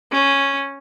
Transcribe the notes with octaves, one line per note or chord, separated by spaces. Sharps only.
C#4